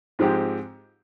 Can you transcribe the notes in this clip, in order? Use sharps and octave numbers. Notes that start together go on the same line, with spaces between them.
G#2 F3 G#3 C4 G4